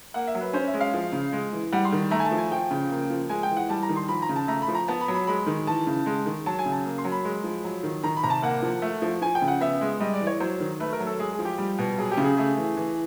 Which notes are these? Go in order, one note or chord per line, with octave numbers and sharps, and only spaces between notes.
A#3 F#5
E5
F#3
B4
C#4 C5
E5
G#3
F5
F3
C#3
G#3
E3
G3 F#5
C6
D#3
A3 A#5
G#5
A5
F3
G#5
F3 G5
C#3
A#3
F3
G#3 G#5
G5
E3
F#5
G3 A5
A#5
D#3
C6
F3 B5
A#5
C#3
A5
A3 A#5
B5
F3
A#5
B3 A5
B5
F#3
B5
G#3 B5
D#3
E3 A5
C#3
G#3
D#3
F#3 A5
G#5
C#3
A5
A#3
C6
F#3
B5
G#3
F3
F#3
D#3
D#3 A#5
B5
C3 A#5
A5
A#3 F#5
F3
A3
F3
F3 G#5
G5
C#3
F#5
B3 E5
G#3
G3 D#5
D5
E3
C#5
F#3 C5
D#3
A3 B4
A#4
F#3
A4
G#3 G#4
G#4
F3
G4
G3
B2
F#3 G#4
G4
C#3
G#4
A3 G#4
E3
E3